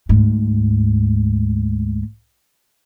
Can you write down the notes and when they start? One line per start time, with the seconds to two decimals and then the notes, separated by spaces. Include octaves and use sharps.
0.09 D2 G#2